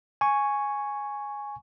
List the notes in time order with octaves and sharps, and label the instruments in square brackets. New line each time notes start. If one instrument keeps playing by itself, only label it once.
[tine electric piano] G#5 C#6